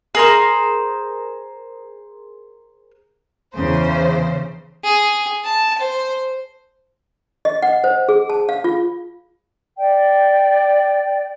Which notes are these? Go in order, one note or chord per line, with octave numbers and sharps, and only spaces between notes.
G#4 A#4 C5
E2 C#3 C5
G#4
A5
C5
D#5
F#5
C5
G#4
A5
F5
F4
D5 G5